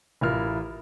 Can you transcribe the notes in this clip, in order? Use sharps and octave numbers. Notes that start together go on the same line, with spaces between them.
A1 E4 F4 A#4 F6